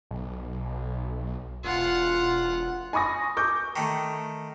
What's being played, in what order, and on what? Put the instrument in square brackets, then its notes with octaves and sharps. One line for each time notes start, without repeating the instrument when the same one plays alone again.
[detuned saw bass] B1
[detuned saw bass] E1 [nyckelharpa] F4 F#5
[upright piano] G#5 B5 C#6 D#6 A#6
C#6 D6 G6
[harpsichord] D#3 A3